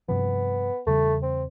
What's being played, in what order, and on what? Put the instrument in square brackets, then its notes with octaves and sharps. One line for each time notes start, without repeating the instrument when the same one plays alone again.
[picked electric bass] G2 C3 F3 [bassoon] B3
[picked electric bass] E2 C#3 G3 [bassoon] A3
[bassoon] C4